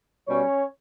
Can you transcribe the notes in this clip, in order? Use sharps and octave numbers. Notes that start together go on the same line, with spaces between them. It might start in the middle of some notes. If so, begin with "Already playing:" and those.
B2 G3 C#4 C#5